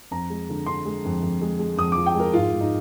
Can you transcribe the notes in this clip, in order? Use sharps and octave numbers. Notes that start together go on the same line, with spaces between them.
F2 A#5
G#3
D3
D3 C6
G#3
F2
F2
G#3
G#3
F2 D#6
F3 D6
G5
G#3 A#4
G#2 F4
G#2
D#4